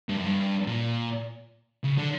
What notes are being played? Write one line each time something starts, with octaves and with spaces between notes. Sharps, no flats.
G2
F#2
G2
A#2
C#3
D3